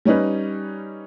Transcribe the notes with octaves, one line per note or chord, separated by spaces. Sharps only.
G3 C#4 D#4 B4